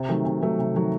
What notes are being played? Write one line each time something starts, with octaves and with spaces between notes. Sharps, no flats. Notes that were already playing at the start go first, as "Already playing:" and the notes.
Already playing: C3
D#3 F#3 A3
C3
D#3 F#3 A3
C3
D#3 F#3 A3